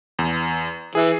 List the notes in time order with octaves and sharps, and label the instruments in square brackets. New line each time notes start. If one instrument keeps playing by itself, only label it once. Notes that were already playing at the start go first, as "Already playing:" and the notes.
[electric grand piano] E2
[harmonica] E3 [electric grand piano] G#4